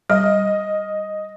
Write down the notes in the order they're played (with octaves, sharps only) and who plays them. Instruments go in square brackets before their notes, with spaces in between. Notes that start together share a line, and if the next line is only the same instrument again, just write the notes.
[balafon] G3 [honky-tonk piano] D#5